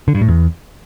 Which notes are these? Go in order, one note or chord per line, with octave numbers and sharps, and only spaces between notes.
D3
G2
A2
E2